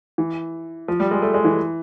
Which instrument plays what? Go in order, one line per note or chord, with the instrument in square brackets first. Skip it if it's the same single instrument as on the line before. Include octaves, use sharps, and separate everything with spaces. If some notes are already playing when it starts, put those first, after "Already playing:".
[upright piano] E3
F3
G3
G#3
A3
G#3
E3